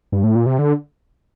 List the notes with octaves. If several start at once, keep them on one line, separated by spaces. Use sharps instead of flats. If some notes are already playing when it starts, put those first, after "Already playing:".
G2
A2
A#2
C3
D3